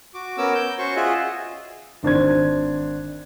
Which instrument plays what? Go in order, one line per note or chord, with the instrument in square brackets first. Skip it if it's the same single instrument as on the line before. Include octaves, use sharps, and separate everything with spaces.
[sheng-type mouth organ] F#4 D6
B3 C#4 A#4 D6 E6
G6
C#4 F#4 C5 C#6
F4 G#4 D#5 E5 F#5
[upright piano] G#1 D4 C5 G#6